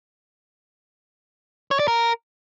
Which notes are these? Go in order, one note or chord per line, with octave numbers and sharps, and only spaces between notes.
C#5
D5
A#4